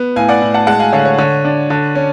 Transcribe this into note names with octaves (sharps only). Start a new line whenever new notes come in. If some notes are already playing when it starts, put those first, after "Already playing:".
Already playing: B3
A2 F5 G#5
D5 F#5
A2
F#5 A5
G#3 F#5 A5
F5 G#5
D3 C#5 F5
C#5
D3 C#5
D4
D3
C#4